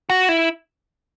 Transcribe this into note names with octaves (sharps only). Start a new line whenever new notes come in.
F#4
E4